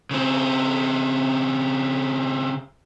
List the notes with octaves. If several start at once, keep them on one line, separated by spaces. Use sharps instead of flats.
C#3 C4